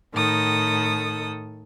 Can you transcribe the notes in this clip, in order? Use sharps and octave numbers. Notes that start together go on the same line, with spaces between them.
A2 D#3 A4 D#6